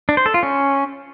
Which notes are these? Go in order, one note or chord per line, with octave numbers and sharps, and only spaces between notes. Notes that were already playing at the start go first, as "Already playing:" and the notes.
D4
C5
A4
F4
C#4